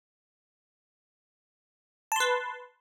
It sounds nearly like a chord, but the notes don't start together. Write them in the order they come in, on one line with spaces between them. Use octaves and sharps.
A5 C6 B4